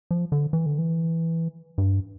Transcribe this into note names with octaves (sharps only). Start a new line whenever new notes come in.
F3
D3
E3
D3
E3
G2